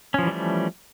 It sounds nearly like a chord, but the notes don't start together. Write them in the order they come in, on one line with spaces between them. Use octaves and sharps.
C#4 F3 E3 G3 A3